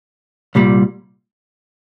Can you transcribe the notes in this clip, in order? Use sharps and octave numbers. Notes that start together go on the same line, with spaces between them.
C2 A#2 G3